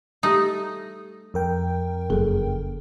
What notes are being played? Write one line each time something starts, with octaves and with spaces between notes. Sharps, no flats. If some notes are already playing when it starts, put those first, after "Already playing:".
G3 A3 D#4 G4
F2 A#4 G5
F#1 G#4 A4